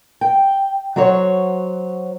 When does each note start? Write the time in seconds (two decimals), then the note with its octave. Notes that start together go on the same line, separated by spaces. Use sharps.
0.21 G5
0.96 F#3 F#4 C5 C#5